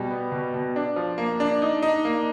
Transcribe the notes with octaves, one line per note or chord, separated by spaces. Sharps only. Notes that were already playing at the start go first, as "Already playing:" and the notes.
Already playing: B2 G3
B3
B2
B2
D4
F3
A#3
D4
D#4
D#4
A#3